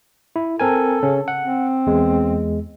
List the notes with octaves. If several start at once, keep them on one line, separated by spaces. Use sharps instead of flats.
E4
C4 A4 A#4 G#5
C#3 C#4
F#5
C4
E2 G#3